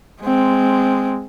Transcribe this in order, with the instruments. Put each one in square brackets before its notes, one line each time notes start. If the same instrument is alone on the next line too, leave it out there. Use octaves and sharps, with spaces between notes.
[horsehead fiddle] G#3 C4